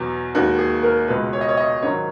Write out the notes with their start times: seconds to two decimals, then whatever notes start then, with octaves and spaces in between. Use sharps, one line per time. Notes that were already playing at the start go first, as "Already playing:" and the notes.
Already playing: E2 B2 F#3
0.34 D#2 D#3 G#3 F#4
0.59 G#4
0.83 A#4
1.08 C#2 B2 G#3 B4
1.33 C#5
1.41 D#5
1.49 C#5
1.57 D#5
1.82 G#2 D#3 F#3 C#5